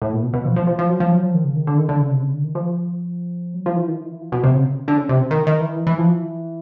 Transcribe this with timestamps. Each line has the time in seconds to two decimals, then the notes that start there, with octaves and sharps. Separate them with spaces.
0.02 A2
0.13 A#2
0.23 B2
0.33 B2
0.45 F3
0.56 F3
0.67 F3
0.79 F3
0.89 F#3
1.00 F3
1.12 F#3
1.23 F3
1.34 D#3
1.44 C#3
1.56 D#3
1.67 D3
1.78 D#3
1.89 D3
2.00 C#3
2.11 C3
2.21 C#3
2.33 D3
2.43 D#3
2.55 F3
3.54 F#3
3.66 F3
3.76 E3
3.87 D#3
3.99 E3
4.05 D#3
4.10 E3
4.21 F3
4.32 B2
4.44 C3
4.54 C#3
4.88 D3
4.98 C#3
5.09 C3
5.31 D#3
5.47 D#3
5.61 E3
5.87 E3
5.98 F3
6.08 E3